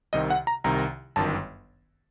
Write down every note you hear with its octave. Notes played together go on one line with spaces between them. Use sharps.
C2 C3 D#3 D#5
F#5
A#5
C2 C3 D#3 A#5
G1 F#2 D#3 A5